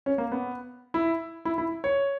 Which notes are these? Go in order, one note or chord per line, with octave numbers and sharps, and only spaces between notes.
C#4
A#3
B3
E4
E4
E4
C#5